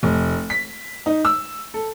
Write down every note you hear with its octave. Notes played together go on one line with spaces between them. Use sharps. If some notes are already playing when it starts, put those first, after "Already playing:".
F1
B6
D#4
E6
A4